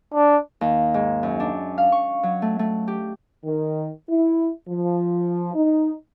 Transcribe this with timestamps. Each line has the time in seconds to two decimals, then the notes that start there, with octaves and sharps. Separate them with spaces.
0.13 D4
0.61 D#2
0.94 G#2
1.23 F#2
1.40 D4
1.78 F5
1.92 C#6
2.23 F#3
2.42 A3
2.59 A3
2.88 G4
3.44 D#3
4.08 E4
4.67 F3
5.54 D#4